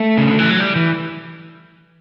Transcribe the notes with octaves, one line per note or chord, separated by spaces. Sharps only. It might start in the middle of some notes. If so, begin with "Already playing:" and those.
Already playing: A3
C#3
D3
E3
F#3
G3
E3